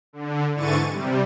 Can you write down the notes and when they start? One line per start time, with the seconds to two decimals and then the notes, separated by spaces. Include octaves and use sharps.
0.13 D3
0.55 G#2 D3 E3 C#6 A6 D#7
0.87 C3 G3